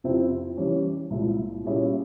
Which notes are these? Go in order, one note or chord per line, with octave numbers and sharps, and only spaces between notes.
F2 C3 F3 C4 E4
E3 G3 C#4
C2 A#2 F3 G#3 E4
A#2 G3 C#4 E4 G#4